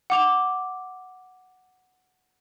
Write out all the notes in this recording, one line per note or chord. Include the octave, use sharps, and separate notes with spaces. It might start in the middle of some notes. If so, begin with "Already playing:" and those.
F#5 D6 F7